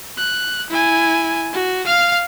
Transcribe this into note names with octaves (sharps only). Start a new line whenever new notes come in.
F#6
E4 G#5
F#4
F5 F6